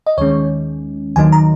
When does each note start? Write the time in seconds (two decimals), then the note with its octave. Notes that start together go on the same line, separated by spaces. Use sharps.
0.07 D#5
0.17 D#2 D#3 G#3 C#4 C#5
1.16 D#2 D#3 F#3 A#3 D#4 G#5
1.32 A#5